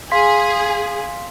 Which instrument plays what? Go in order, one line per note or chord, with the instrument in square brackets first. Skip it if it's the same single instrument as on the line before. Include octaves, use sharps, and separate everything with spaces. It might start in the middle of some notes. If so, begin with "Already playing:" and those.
[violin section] G#4 [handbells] F5 C6 B6